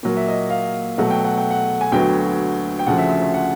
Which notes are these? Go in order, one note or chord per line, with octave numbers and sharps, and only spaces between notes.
A#2 F#3 A#3
E5
D#5
F5
B2 F#3 A3 F#5
G5
F#5
G5
F#5
G#5
D2 D3 F#3 B3 G5
G5
D2 C#3 F3 F#5
E5
E5
E5
F#5